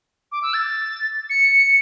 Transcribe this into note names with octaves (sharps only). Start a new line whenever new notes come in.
D6
E6
A6
C#7